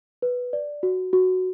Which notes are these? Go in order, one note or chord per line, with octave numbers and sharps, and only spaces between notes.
B4
D5
F#4
F#4